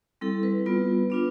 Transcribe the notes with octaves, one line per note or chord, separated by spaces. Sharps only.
G3 C4 E4 A4
B4
G3 B3 F4
B3 D4 F4